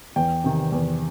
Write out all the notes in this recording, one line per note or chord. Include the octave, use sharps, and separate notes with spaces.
E2 G5
C3 D#3
E2